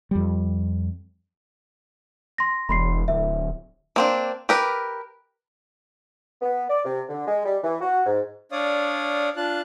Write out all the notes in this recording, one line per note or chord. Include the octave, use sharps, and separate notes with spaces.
F2 G3
C6 A#6
E1 B5 C6 C7
D1 E5
A#3 C4 D4
G4 A#4 B4
B3
D5
C3
D3
G#3
G3
E3
F#4
G#2
D4 C#5 D5 F5 D#6
D4 F4 A5 F#6